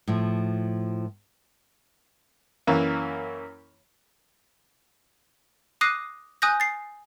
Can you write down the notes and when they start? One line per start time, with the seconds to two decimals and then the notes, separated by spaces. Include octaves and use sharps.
0.08 A2 F3
2.67 F#2 E3 A#3
5.81 D6 D#6 F#6 A#6 C7 D#7
6.42 G#5 D#6 F#6 G6 A#6
6.60 A6 C7